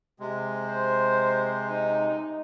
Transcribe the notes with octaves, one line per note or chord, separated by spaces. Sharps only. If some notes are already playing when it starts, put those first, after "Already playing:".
C3 G#3
C5
D#4